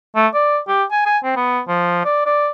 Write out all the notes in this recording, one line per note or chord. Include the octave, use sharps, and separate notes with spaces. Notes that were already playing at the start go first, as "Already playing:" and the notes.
A3
D5
G4
G#5
G#5
C4
B3
F3
D5
D5